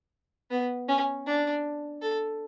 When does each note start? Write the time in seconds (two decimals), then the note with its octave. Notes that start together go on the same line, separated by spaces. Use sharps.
0.50 B3
0.88 C#4
1.27 D4
2.02 A4